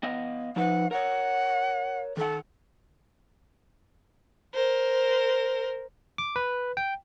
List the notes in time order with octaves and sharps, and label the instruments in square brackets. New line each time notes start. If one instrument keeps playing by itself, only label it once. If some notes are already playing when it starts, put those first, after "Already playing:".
[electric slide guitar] B3 D#5 F5
[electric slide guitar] F3 D#4 B4 [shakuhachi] F#5
[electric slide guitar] A#4 C#5 [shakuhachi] F#5
[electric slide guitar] D#3 F#5 [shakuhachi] A4
[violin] A#4 C5
[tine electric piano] D6
B4
G5